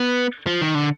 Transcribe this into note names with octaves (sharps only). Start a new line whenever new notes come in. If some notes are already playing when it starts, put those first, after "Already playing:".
Already playing: B3
F3
D#3
D3